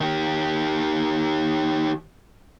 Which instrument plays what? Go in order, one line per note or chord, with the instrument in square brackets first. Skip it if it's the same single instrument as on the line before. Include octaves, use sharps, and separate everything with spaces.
[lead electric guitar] D#3 G4